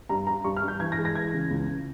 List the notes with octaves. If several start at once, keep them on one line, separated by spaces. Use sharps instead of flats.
G2 A#5
G3 A#5
G2 C#6
F6
G2
G6
E3 G#6
A#6
G#3
A#6
E3 G#6
C#3
C#2